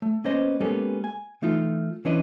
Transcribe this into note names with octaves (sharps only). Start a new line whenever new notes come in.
A3
A#3 B3 C#4 C5 D#5
G#3 A#3 B3 C#4 G4 A4
G#5
E3 A3 D#4 F4
E3 C#4 D4 B4 D#5